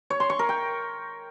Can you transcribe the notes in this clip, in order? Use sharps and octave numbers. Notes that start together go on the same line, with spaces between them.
C#5
C6
C#6
A#4
G5